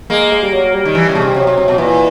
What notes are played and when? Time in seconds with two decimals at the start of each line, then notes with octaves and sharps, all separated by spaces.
0.10 G#3 A#3
0.32 G#3
0.42 G3
0.53 F#3
0.73 G3
0.85 D#3
0.95 E3
1.09 C#3
1.15 B2
1.22 C3
1.36 C3 F#3
1.47 C3
1.58 C3
1.68 B2
1.78 A#2 E3